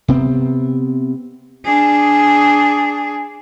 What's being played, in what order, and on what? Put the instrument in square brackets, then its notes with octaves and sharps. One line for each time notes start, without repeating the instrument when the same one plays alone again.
[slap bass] C3 B3 C4
[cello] D4 G#4